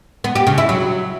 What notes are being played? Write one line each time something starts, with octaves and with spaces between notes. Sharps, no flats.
B3
G4
C#3
E4
F#3